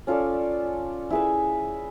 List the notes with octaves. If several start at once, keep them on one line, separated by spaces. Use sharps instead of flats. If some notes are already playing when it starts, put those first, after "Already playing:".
C#4 F4 A4 D5
E4 G#4 B4 E5